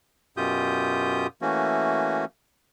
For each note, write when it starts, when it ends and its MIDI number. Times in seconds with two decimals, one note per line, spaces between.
0.37 1.27 42
0.37 1.27 47
0.37 1.27 65
0.37 1.27 67
0.37 1.27 87
0.37 1.27 91
1.42 2.25 52
1.42 2.25 57
1.42 2.25 58
1.42 2.25 61
1.42 2.25 66